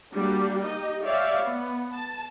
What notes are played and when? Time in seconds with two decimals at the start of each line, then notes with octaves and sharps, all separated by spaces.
0.13 G3 A#3 D4 F#4 G4
0.61 D#4 G4 D#5
1.02 G4 C#5 D5 E5 F5
1.42 B3
1.93 A5